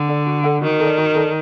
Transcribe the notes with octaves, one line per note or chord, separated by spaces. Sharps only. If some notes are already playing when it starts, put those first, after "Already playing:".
Already playing: D3
A4 D5 F#5
F#4
A4 D5 F#5
D#3 F#4
A4 D5
F#4
A4 D5